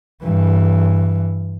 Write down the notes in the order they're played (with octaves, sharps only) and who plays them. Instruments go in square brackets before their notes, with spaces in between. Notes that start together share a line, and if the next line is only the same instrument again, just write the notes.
[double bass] G2 E3